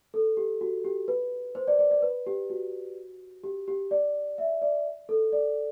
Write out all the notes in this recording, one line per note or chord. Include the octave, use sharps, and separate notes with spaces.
A4
G4
F#4
G4
B4
C5
D5
D5
D5
B4
G4
F#4
G4
G4
D5
E5
D5
A4
D5